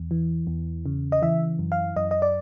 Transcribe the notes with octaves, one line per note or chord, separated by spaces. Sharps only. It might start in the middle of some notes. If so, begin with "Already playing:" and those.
Already playing: E2
E3
E2
C#3
D#5
E3 E5
F#2
F5
F#2 D#5
D#5
D5